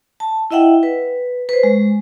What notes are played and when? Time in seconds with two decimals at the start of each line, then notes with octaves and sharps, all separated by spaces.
0.20 A5
0.51 E4 D#5 E5 F#5 G5
0.83 B4
1.49 B4 C5
1.63 G#3